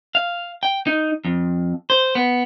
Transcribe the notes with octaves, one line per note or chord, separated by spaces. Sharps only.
F5
G5
D#4
F2
C5
B3